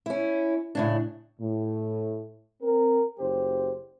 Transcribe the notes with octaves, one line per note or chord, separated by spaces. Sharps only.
C#4 E4
A2 C#3 D4
A2
C4 A#4
F#1 F#3 G4 C5